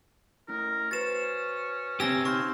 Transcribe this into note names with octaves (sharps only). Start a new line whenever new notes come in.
A3 C#4 E4 A#4
C#4 F#4 B4 C5 A6 E7
C4 C#4 G4 G#5 E6 A#6
D#4 F5 C6 C#6 G6